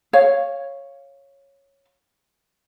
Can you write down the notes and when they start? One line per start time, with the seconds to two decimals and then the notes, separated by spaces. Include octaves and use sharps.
0.13 C#5 F5